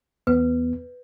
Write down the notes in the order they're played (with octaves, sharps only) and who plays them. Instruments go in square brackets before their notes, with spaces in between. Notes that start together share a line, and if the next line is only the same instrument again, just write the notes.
[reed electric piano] E2 B3 [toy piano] B4